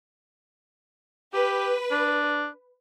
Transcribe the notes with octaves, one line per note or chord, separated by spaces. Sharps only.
G4 B4
D4